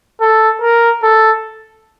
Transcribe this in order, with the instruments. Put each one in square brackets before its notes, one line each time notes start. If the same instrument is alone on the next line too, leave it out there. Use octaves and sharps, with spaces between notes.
[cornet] A4
A#4
A4